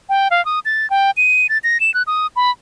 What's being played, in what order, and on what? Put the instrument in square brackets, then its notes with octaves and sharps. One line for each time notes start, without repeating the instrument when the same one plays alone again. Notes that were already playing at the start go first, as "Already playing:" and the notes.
[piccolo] G5
F5
D#6
A6
G5
D#7
A6
A#6
E7
F#6
D#6
B5